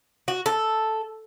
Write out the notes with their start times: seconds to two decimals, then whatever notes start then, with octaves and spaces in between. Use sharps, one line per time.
0.28 F#4
0.46 A4